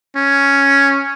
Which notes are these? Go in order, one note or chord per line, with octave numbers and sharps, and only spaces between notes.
C#4